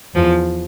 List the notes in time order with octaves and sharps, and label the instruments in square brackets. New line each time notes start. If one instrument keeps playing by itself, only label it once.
[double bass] E2 [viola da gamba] F3